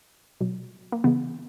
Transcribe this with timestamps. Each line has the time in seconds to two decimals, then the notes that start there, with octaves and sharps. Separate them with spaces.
0.41 B2 F#3
0.92 A#3
1.04 C#3 E3 G#3 B3